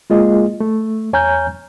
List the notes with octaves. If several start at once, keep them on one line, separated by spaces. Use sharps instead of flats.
G#3 A#3 F4 G#4 D#5
A3
E2 C#5 G#5 A#5 F6 G6